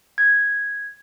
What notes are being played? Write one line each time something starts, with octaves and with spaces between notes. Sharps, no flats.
G#6